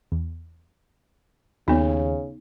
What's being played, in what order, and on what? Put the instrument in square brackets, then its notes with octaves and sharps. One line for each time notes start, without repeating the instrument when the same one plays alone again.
[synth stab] E2
[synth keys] D#2 [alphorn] C#3 [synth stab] F#3 [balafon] B3 D#4